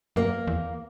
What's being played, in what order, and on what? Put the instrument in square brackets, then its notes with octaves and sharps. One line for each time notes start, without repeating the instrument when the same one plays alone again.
[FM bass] F#2 [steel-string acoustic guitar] A#3
[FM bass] E2